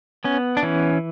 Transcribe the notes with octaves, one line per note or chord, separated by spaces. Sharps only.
B3 C#4
D4
E3 C#4